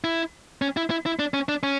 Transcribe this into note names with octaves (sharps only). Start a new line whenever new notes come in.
E4
C#4
E4
E4
E4
D4
C#4
D4
C#4